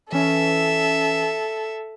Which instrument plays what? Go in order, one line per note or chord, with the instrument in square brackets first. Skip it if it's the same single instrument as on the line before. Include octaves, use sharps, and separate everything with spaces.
[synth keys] E3 C#4 [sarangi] A4 [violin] E5